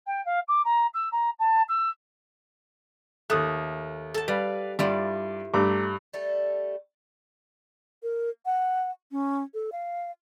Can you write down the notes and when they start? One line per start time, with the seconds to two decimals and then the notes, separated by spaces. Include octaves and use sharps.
0.06 G5
0.25 F5
0.48 D6
0.64 A#5
0.93 E6
1.12 A#5
1.39 A5
1.68 E6
3.30 D#2 A3 D#6 F#6
4.14 A4 A5
4.28 G3 B4 D5 F5
4.79 G2 G3 E4 F4 D5
5.54 G2 A3 A#5 D6
6.13 G3 A3 A4
8.03 A#4
8.46 F#5
9.12 C#4
9.54 A4
9.72 F5